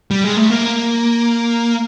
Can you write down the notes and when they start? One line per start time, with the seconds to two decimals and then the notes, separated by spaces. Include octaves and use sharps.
0.11 G3
0.24 G#3
0.37 A3
0.50 A#3